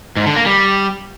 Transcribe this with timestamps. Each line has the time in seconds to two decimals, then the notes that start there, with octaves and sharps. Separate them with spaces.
0.17 G#2
0.26 D3
0.36 A#3
0.46 G3